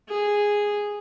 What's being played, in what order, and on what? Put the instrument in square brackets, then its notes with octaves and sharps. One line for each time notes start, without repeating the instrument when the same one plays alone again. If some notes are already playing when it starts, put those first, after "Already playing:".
[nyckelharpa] G#4